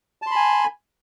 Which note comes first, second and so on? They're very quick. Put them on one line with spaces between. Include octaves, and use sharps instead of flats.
A5 C6 B5 G#5